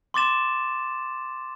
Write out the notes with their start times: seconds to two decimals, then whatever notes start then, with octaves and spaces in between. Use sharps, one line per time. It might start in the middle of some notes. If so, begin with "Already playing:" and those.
0.14 C6 D6 A6 E7